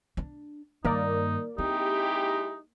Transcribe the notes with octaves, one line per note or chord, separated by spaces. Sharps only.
D4
G2 D#3 A#3 D#4 A#4 D5
G#3 C4 D#4 E4 G4